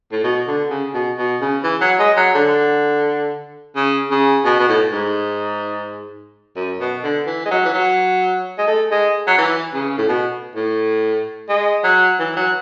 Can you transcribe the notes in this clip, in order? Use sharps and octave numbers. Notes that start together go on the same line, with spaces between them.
A2
B2
D3
C#3
B2
B2
C#3
E3
F#3
G#3
F#3
D3
C#3
C#3
B2
B2
A2
G#2
F#2
B2
D3
E3
G#3
F#3
E3
F#3
G#3
A3
G#3
F#3
E3
C#3
A2
B2
A2
G#3
F#3
E3
F#3